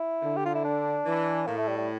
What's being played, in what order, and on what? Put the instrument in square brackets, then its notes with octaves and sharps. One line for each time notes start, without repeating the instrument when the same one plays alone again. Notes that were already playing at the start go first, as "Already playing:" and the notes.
Already playing: [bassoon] E4
[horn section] D3
[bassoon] G4
F4
E4
D4
[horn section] E3
[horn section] A2 [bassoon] A#3
[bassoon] A3
G3
G3